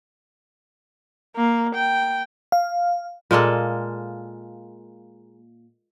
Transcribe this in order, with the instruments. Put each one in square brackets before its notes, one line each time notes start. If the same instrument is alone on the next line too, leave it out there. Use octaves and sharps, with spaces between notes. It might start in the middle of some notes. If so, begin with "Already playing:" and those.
[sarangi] A#3
G5
[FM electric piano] F5
[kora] A#2 G#3 A#3 A4